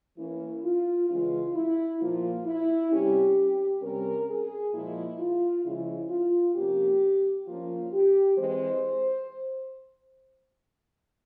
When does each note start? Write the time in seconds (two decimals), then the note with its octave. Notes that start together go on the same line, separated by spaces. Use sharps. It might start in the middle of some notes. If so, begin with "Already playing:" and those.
0.18 E3 A#3 C#4 E4
0.64 F4
1.09 C#3 E3 G#3 C#4 F4
1.55 E4
2.00 A#2 F3 A#3 F4
2.46 E4
2.92 C3 G3 C#4 G4
3.82 C3 G3 C#4 A#4
4.29 G#4
4.74 A#2 F3 G#3 E4
5.20 F4
5.65 C#3 F3 G#3 E4
6.10 F4
6.55 C3 F3 A#3 C#4 G4
7.47 F3 A#3 C#4 F4
7.93 G4
8.38 E3 G#3 C4 C5